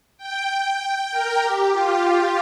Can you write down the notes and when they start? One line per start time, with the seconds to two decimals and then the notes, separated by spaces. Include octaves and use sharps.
0.18 G5
1.11 A#4
1.42 G4
1.72 F4
2.04 F4